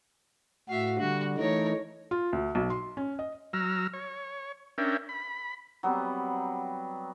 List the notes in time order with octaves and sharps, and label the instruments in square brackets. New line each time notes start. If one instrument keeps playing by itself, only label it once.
[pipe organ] A2 F#4 [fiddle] E5 F5
[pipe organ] D3 G3 [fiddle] F#4
[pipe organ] E3 A3 D#4 [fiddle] A#4 C#5
[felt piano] F4
D2
B1
C6
C#4
D#5
[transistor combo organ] F#3 A#5 E6 F6
C#5
C#4 D4 A#4 E5 G5
B5
[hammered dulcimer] F#3 G3 B3 C4